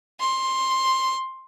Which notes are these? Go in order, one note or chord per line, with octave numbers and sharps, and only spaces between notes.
C6